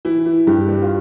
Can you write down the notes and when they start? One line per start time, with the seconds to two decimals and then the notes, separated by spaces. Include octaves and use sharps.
0.05 E3 E4
0.26 E3
0.47 G2 G4
0.68 G3
0.82 F4